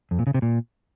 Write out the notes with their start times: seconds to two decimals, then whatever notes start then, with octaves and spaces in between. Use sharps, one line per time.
0.11 F2
0.19 A#2
0.27 C#3
0.34 C3
0.42 A#2